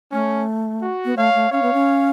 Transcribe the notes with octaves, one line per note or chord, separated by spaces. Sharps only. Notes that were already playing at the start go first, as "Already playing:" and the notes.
A3 C#4
F#4
B3
A3 C#5 F5
A3
C#4 C#5 F5
B3
C#4